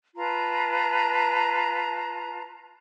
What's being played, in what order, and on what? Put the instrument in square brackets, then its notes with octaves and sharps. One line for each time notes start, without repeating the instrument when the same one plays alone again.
[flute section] F4 B4 A5 A#5